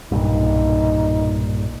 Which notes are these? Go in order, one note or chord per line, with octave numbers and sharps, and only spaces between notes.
B1 G2 A#2 D#4